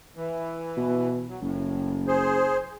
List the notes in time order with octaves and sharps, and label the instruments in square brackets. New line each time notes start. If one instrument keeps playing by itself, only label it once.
[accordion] E3
[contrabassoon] B2
[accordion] F#3
[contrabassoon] F#1 [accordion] A2
[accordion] G#4 C5